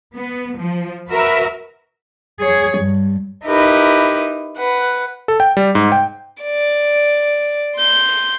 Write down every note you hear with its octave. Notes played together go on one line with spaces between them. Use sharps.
B3
F3
F#4 A#4 B4 E5
G#4 C#5
G2
D#4 E4 G4 A#4 B4
B4 F#5
A4
G5
G3
G#2
G5
D5
C6 G6